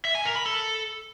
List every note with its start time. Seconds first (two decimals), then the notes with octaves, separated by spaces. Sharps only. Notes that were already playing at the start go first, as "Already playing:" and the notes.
0.05 E5
0.15 G#5
0.25 A#4
0.36 B5
0.46 A4